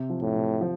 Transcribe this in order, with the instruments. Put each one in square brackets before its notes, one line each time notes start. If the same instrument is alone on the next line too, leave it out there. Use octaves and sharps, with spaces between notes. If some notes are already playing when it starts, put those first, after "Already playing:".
Already playing: [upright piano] C3
F3
[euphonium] A2
[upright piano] C3
F3